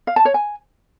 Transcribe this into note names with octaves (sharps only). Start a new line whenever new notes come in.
F5
A5
C#5
G#5